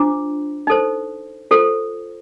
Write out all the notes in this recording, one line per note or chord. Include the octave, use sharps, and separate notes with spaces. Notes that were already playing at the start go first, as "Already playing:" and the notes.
Already playing: D4 F4 C5 A#5 D6
D#4 A4 C5
F4 A4 C5